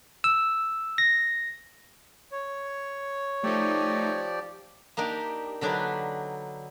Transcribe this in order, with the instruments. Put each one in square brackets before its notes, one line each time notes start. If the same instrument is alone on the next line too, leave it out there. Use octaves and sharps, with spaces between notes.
[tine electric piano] E6
A#6
[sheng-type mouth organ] C#5
[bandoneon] F3 G4 D5 [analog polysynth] A3 D#4
[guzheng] A#3 D4 D#4 G4
D3 F#3 D4 D#4 G4 B4